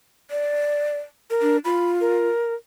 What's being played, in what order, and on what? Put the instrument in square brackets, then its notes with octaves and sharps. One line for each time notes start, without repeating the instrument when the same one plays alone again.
[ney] D5
[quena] A#4
[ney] D4
[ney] F4 [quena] B5
[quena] A#4